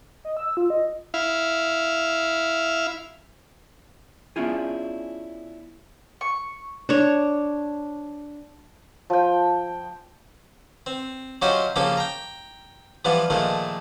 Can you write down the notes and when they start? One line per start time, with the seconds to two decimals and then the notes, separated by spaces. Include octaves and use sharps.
0.25 D#5
0.37 E6
0.57 F4
0.70 D#5
1.14 E4 F5
4.36 B3 C#4 D4 E4 F4 G#4
6.21 C#6
6.89 D4 C#5
9.10 F3 G5
10.86 C4
11.42 F#3 C#4 F4 G4 C5 D#5
11.76 C#3 F3 A#3 G4 A4
11.97 G5 A#5
13.05 E3 F3 G3 B3 F4
13.30 A#2 D#3 F3 G#3 A3